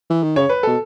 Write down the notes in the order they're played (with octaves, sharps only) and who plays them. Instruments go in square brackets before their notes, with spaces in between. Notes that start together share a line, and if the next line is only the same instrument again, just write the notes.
[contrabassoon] E3
D#3
[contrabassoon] C#3 [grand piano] C#5
[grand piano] B4
[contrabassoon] B2 [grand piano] A4